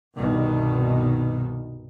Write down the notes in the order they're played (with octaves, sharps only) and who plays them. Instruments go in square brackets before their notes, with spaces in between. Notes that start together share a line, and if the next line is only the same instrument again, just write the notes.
[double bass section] C2 G2 B2 D#3